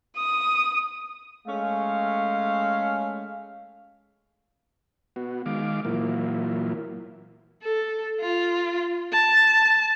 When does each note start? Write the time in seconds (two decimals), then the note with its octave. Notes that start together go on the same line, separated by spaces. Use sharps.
0.17 D#6
1.47 G#3 A3 C#4 F5
5.16 B3 F#4
5.46 D#3 G#3 F5 D6
5.85 A#2 E3 F#3 A#3 E4 F4
7.62 A4
8.20 F4
9.12 A5